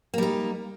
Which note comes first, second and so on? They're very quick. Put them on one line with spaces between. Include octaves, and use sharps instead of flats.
A#3 G3 D#4